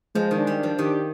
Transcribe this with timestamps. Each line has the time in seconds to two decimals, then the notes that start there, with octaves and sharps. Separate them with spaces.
0.15 F3 G#3
0.31 D#3
0.37 D4
0.47 G3
0.57 D4
0.63 F3
0.79 D#3 G4